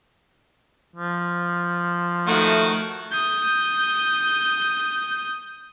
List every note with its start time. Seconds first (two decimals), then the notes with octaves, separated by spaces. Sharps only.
0.96 F3
2.28 D#3 A3 F#4
3.12 D#6 G6